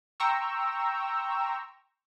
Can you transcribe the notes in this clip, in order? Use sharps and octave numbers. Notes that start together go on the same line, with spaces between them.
G5 A#5 C6 C#6 E6